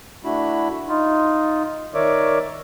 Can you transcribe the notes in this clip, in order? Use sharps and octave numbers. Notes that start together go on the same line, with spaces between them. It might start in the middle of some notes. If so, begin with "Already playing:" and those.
A3 D4 E4 F#4 B5
D#4 F4
D#3 A#4 C#5 D5 E5 D6